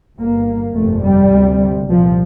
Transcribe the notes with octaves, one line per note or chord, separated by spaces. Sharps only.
G1 G2 A#3
G1 F2 C3 A3
G3
D2 C3
C2 A#2 F3